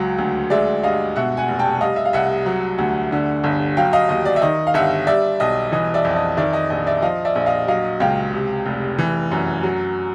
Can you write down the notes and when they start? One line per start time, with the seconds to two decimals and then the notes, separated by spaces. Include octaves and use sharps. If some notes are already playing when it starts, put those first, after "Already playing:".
Already playing: C#2 F#3
0.18 D2
0.50 G#3 D5 E5
0.83 G2 D#5 F5
1.16 B2 E5 F#5
1.37 F#5 G#5
1.48 F1
1.59 G5 A5
1.81 G3 D#5 F5
1.96 E5
2.05 F5
2.13 C2 E5 F#5
2.46 F#3
2.79 D2
3.12 D3
3.44 G1
3.77 F#3 F5 G5
3.93 D#5 F5
4.09 D#2 D#5
4.26 D5
4.36 E5
4.42 D#3 D#5
4.67 F5
4.74 G1 E5 F#5
5.07 G3 D5 E5
5.40 B1 D#5
5.72 E3 D#5
5.94 D5 E5
6.05 F2
6.16 D#5
6.37 D#3 D5 E5
6.53 D#5
6.70 A#1 D#5
6.87 D5 E5
7.02 F3 D#5 F5
7.25 D5 E5
7.35 A#1
7.46 D#5 F5
7.68 F#3 D#5 F5
8.00 C#2 F5 G5
8.33 C3
8.66 F1
8.98 E3
9.32 F#2
9.63 F#3